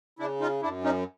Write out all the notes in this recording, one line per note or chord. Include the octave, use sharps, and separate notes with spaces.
C#3 D4 E4
D#4 F4
F#2 D4 E4
C#4 D#4